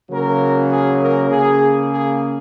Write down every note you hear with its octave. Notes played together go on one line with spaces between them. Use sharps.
C#3 F#3 A#3 A#4
G#4
A#4
C#3 A#3 G#4
G#4